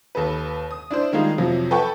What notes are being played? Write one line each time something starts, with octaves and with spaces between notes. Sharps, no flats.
D#2 A4 B4
D#6
D4 E4 C5
D#3 G3 G#3 D#4 F4
F2 C3 F3 F#3
A4 B4 F#5 G5 A5 C#6